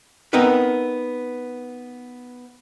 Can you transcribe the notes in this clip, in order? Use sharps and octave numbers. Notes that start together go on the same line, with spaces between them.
B3 C4 D#4 A#4 B4